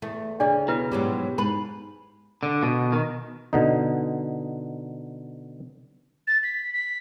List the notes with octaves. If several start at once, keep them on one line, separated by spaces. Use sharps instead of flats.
E2 A3
D2 C#3 D4 G#4 D5
B2 E4 B4
G#2 F#3 G3 G4
G#2 B4 B5
D3
B2
D#3
B2 D3 D#4
A6
B6
B6